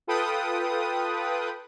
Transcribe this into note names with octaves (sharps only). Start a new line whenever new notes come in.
F4 A4 B4 G5 D#6